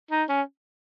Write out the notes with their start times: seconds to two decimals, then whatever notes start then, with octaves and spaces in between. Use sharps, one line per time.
0.11 D#4
0.29 C#4